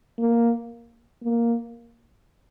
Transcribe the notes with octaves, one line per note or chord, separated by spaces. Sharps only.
A#3
A#3